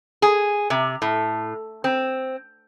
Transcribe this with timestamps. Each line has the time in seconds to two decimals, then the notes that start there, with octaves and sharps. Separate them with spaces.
0.22 G#4
0.70 C3
1.02 A2
1.84 C4